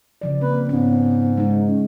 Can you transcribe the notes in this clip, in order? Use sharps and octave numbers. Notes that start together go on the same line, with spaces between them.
C#3 F3 D5
A#3 C4 B4
G#2 B3 C#4
G#3 D#4
C#4